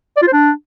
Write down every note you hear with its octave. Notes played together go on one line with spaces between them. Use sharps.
D5
F4
C5
D4